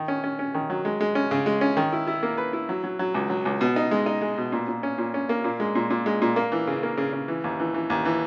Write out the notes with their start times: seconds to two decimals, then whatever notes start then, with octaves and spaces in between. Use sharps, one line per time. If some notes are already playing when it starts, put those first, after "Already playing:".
Already playing: D#3
0.08 C#4
0.24 C#4
0.39 C#4
0.55 D#3
0.70 F#3
0.85 G#3
1.01 G#3
1.15 C#4
1.31 C#3
1.46 G#3
1.61 C#4
1.77 D#3
1.93 E4
2.07 E4
2.23 A#3
2.38 B4
2.53 E4
2.69 F#3
2.84 F#3
2.99 F#3
3.14 C#2
3.30 F#3
3.45 C#2
3.61 B2
3.76 D#4
3.91 G#3
4.06 D#4
4.22 G#3
4.37 B2
4.52 A#2
4.68 A#2
4.83 C#4
4.98 A#2
5.14 C#4
5.29 A#3
5.44 A#2
5.60 G#3
5.75 A#2
5.90 A#2
6.06 G#3
6.22 A#2
6.36 A#3
6.52 E3
6.67 C#3
6.83 A#3
6.97 C#3
7.13 C#3
7.28 E3
7.44 D#2
7.59 E3
7.74 E3
7.90 D#2
8.05 E3